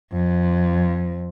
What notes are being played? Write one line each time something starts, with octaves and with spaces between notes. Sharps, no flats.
F2